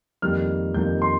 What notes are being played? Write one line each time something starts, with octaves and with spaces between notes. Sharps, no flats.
F2 D#3 G3 A#3 F6
F2 D#3 G3 A#3 G6
C6